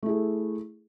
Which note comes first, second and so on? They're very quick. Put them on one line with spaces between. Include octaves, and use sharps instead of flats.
A3 E4 G#4